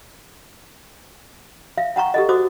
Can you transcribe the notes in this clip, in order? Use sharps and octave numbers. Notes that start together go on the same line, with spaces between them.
E5 F5
F#5 G5 A#5 C#6
G4 A4 D#5
F#4 C5 D6 D#6